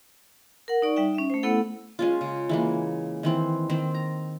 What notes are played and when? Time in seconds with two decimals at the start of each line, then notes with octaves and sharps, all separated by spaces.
0.68 A#4 F#5
0.82 D#4 D5 C#6
0.96 G3 D#4 E5 G5
1.14 C#4 E5
1.30 A3 C5
1.43 A3 B3 E4 A4 F#5
1.99 G#3 C#4 F4
2.21 C#3
2.49 E3 G#3 A#3
3.23 D#3 E3 C4
3.70 D#3 C4
3.94 A#5